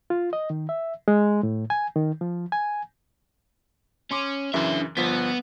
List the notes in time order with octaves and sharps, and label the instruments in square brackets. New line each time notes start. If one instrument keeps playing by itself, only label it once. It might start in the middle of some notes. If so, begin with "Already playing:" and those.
[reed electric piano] F4
D#5
D#3
E5
G#3
A2
G#5
D#3
F3
G#5
[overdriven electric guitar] C#4 [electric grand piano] C6 D6
[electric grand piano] F#2 C#3 E3 [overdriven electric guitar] D4 E5
[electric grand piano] G1 F3 B6 [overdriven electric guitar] B3